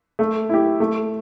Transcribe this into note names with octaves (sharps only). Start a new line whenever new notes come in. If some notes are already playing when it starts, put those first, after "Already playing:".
A3
E4 G4
A3